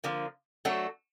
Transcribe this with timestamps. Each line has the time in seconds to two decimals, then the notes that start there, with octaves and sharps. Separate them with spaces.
0.04 D3 F3 A#3
0.65 F#3 A3 D4 F#4 A4